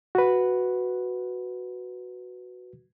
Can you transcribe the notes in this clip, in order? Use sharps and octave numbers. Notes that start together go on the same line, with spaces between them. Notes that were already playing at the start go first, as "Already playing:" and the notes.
F#4 B4